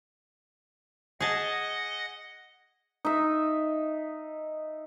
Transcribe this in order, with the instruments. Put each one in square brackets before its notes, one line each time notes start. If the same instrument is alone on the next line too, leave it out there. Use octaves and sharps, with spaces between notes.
[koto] G#4 A5 [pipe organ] D#5 F#5
[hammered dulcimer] D#4 E5